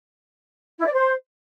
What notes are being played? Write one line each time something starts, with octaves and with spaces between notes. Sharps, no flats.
E4
D5
C5